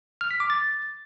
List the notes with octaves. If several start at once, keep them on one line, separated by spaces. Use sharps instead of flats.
F6
B6
D6
A6